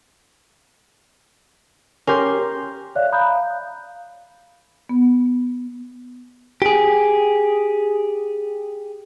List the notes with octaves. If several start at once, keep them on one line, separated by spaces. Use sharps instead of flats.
C#4 G4 A#4 C6 G6
C#5 D5 E5 F5 F#6
F5 A#5 B5 D#6 F#6 G6
F5
B3
G4 G#4